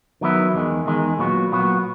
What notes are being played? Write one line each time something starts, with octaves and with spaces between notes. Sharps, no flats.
D#3 F#3 B3 E4
E2 D#3 G#3
E2 D#3 G#3
A#2 F#3 B3 F#4
A#2 F#3 B3 F#4